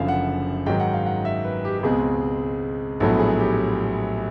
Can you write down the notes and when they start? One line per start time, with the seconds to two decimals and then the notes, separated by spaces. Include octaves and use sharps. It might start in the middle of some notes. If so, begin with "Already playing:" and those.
Already playing: F#1 F#2 D3 F3 E5 F5
0.08 F#5
0.66 G#2 D#3 F#3 G5
0.80 F#5
0.94 F5
1.06 F#5
1.25 E5
1.44 B4
1.65 G4
1.79 G4
1.83 C#2 B2 G#3 C4 G#4
3.00 A#1 A2 F#3 B3 A4
3.20 G#4
3.40 G4